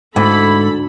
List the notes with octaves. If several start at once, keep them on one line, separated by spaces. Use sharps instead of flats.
D2 G#2 E4 A4 B5